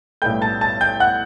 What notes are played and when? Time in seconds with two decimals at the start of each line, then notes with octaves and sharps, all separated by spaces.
0.22 B1 A2 G3 B3 G5 G6
0.42 A5 A6
0.61 A5 A6
0.81 G5 G6
1.00 F#5 F#6